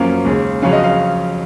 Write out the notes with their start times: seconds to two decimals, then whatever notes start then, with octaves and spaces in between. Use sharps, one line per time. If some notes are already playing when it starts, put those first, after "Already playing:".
Already playing: F#2 F3 A#3 C#4 F5
0.25 D#2 C#3 G#3
0.62 F2 C#3 F#3 C#4 F5
0.73 D#5
0.84 F5